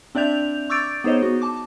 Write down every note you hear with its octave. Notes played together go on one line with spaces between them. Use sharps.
C4 D4 D5 E5 G6 F7
C#6 D6 E6 G6 A6 D7
B3 D#4 G#4 C5 C#5 D#5
B3 F#4
A5 D6